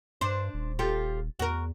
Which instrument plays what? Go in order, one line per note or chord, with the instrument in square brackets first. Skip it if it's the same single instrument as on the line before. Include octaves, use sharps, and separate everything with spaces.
[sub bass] G2 [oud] D4 C5
[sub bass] D#1
[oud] F4 G4 A4
[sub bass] E2 [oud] F#4 A#4